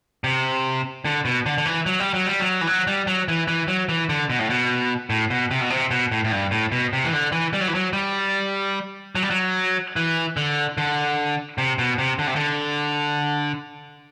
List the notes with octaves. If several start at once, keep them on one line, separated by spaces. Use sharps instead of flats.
C3
D3
B2
D3
D3
E3
F#3
G3
F#3
G3
F#3
E3
F#3
G3
F#3
E3
E3
F#3
E3
D3
B2
A2
B2
A2
B2
C3
B2
C3
B2
A2
A2
G2
A2
B2
C3
E3
D3
E3
G3
F#3
E3
F#3
G3
F#3
G3
F#3
E3
D3
D3
C3
B2
C3
D3
C3
D3